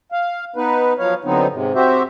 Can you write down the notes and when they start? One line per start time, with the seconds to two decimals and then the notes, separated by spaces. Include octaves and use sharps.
0.12 F5
0.56 B3 D#4 B4
0.98 F3 F#3 C#5 F5
1.24 D3 F#3 B3 C4 D#4
1.51 G#2 C3
1.75 C4 F#4 G4 C5 E5